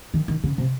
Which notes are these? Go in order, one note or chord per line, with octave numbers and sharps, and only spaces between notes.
D#3
D#3
C#3
C3